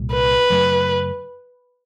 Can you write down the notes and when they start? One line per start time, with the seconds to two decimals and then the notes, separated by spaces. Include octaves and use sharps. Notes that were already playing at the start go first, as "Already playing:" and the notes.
Already playing: C2 A#2 G3
0.13 B4
0.50 F#2 C#3 F#3 A3